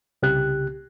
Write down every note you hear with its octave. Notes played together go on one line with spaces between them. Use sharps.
C2 C#3 G4 F#6